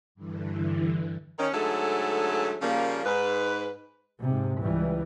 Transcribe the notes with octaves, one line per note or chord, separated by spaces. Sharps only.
G2 D3 E3
D#3 C#4
G#2 D3 F#3 A3 G#4 A4
C#3 F3 G3 A#3
G#2 B4
G#2 C3
C#2 E3 G3